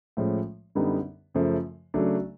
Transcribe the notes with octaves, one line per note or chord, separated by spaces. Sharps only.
A2 F3 G#3 C#4
F#2 D3 G3 B3 D#4
F#2 C#3 F3 A3
C#3 F#3 A3 D4